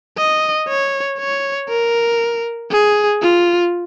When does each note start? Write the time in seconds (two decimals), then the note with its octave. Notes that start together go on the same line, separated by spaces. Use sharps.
0.17 D#5
0.68 C#5
1.19 C#5
1.69 A#4
2.71 G#4
3.22 F4